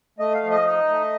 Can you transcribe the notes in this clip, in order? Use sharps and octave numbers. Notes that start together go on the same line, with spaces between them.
A3 D#5
F5
F3
D#5
D#4
A3